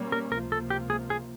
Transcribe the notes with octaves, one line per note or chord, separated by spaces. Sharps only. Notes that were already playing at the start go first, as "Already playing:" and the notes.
Already playing: B2 G3 A#3 C#4
A#4
C#2 C3 F3 A#3 A#4
A4
G4
G#4
G#4